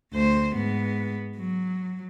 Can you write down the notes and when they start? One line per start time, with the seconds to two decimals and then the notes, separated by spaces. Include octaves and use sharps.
0.14 D2 C5
0.56 G#2 B3
1.37 F#3